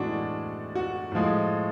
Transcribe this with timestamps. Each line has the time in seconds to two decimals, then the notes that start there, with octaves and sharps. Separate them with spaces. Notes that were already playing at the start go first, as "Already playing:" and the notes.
Already playing: A2 E3 G#3 D4 F#4
0.75 F#4
1.12 A2 F3 G#3